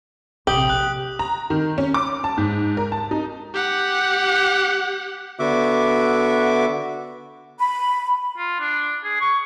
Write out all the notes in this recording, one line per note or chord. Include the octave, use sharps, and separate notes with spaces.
A#1 C3 G4 D#6 F#7
F#6
A#5
D#3
C#4
D6
A5
G#2
A#4
A5
D#4
G4 F#5
D3 B3 F#4 E5 D6
B5
F4
D4
G#4
C#6